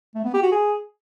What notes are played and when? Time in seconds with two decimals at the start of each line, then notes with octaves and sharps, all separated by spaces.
0.15 A3
0.24 B3
0.33 G4
0.43 F#4
0.52 G#4